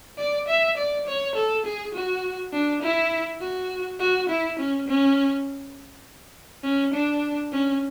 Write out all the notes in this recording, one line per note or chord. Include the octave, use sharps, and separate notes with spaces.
D5
E5
D5
C#5
A4
G#4
F#4
D4
E4
F#4
F#4
E4
C#4
C#4
C#4
D4
C#4